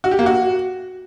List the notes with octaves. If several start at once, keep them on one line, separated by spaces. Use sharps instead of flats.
F#4
G4
A#3
F#4